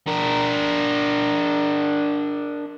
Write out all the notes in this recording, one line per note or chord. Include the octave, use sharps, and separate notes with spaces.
D4 A#4